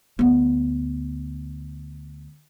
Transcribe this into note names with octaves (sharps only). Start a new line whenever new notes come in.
D2 B3